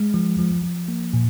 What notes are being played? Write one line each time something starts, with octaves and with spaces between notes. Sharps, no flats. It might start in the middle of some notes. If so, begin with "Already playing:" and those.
Already playing: G#3
F3
F3
F3
A#3
A#2